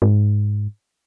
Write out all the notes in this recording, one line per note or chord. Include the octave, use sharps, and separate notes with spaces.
G#2